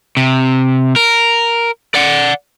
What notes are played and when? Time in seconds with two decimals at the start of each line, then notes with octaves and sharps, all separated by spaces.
0.17 C3
0.96 A#4
1.95 D5 F#5